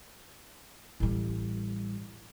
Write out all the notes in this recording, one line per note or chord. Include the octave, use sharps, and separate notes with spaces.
A1 G3